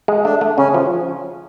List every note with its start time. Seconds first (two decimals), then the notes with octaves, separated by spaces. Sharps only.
0.08 G#3
0.25 A3 D4
0.41 A3
0.58 C#3 C#4
0.74 F3